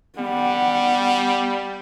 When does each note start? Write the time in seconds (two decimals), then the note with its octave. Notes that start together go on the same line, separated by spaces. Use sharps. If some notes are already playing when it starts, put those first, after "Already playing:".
0.19 G3 B3 F#5